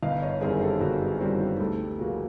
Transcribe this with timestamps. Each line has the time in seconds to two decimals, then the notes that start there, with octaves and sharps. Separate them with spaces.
0.02 G1 D#5 F5
0.22 C#5 D#5
0.41 F#2 D#3 G3 C4 G#4 A#4
0.62 G4 A4
0.81 G1 F#4 G#4
1.01 G4
1.20 F#2 D#3 G3 C4 F#4
1.40 G4
1.60 D2 G4 A4
1.99 C#3 F3 A#3 F#4 G#4